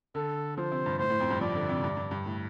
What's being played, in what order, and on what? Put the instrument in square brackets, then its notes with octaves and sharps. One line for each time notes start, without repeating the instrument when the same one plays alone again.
[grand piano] D3 [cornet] A4
[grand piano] F3 [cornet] C5
[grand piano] C3
G2
[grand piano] A2 [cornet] C5
[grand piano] A2
F2
G2
[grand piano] F3 [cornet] D5
[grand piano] D3
C3
G2
G2
G2
A2